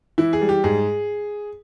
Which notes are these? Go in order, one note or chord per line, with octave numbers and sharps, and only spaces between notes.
E3 E4
G#4
G3
G4
G#2 G#4